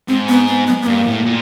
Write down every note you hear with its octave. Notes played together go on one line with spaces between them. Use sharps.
G#2 C4
B3
B3
B3
B3
G2 A#3
A2
A#2